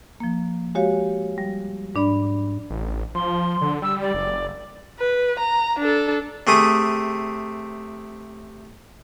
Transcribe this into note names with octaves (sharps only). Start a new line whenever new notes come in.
F3 A#3
G#3 F#4 G4 C#5 F5
G3
G#2 D4 D5 B5
A1
F3 C6
D3
G3 E6
D5
F#1
B4
A#5
D4 A4
C3 A3 G#4 D#6